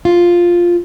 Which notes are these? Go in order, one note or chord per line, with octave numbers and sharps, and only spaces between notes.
F4